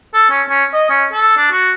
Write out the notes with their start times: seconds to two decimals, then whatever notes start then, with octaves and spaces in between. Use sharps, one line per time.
0.14 A4
0.30 C#4
0.49 C#4
0.73 D#5
0.90 C#4
1.13 A4
1.37 D4
1.51 F#4